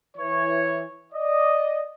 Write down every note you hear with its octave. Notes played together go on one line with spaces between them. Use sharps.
E3 C#5
D5 D#5